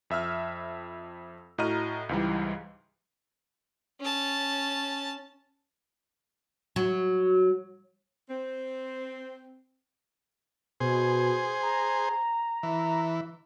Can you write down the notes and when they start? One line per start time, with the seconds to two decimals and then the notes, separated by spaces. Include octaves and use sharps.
0.10 F2 E5 E6 F6
1.58 A2 F#4 D#5 A#5 F6 D#7
2.09 C#2 G#2 E3 G3
4.01 C#4 A5
6.76 F#3
8.30 C4
10.80 B2 G#4 C5
11.63 A#5
12.63 E3